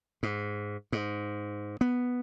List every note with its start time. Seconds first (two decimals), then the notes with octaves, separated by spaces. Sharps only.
0.23 G#2
0.92 G#2
1.81 B3